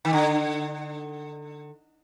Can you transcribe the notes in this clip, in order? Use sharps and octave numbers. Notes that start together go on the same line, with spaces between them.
D#3
D3